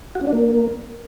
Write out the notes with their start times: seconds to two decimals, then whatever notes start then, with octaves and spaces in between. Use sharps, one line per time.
0.15 F#4
0.21 C#4
0.27 D4
0.33 A#3